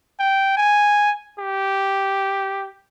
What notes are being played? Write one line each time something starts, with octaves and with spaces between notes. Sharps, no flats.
G5
G#5
G4